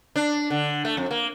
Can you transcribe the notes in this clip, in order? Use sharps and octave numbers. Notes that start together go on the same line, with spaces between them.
D4
D3
A3
F2
A#3